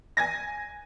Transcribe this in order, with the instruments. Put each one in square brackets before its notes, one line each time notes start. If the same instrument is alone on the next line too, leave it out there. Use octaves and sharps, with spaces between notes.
[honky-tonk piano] G#5 G#6 A#6